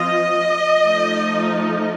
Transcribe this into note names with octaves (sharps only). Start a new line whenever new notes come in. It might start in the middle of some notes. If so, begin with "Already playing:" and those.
Already playing: F3 C4 F4 D#5
F3 A3 D#4